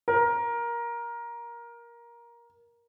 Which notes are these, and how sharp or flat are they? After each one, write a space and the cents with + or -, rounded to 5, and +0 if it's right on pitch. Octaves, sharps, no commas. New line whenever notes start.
A#4 +15